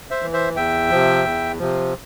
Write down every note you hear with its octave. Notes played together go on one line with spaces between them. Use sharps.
C5 E5
E3
C5 E5
E2 E5 G5
C3 F3
E2
C3 F3